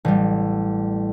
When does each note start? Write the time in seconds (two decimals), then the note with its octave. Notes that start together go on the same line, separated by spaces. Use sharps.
0.05 A1 G3